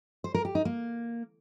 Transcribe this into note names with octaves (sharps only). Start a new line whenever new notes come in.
C5
A#4
G4
D#4
A#3